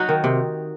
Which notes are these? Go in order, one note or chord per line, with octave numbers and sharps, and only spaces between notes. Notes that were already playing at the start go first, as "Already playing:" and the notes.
Already playing: F#3 D#4 F#4
D#3
C3